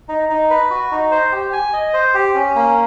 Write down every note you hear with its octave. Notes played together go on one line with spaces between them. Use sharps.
D#4
D#4
B4
F#4
D#4
C5
G4
G#5
D#5
C5
G4
C#4
A#3